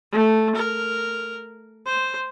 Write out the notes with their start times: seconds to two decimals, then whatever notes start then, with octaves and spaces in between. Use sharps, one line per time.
0.12 A3
0.55 A#4
1.86 C5